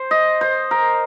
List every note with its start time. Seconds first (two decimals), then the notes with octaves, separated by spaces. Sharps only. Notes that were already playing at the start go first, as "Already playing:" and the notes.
Already playing: C5
0.11 D#5
0.41 C5
0.71 A#4